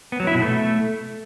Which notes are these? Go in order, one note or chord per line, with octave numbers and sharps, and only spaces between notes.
B3
F#3
E4
B2
A3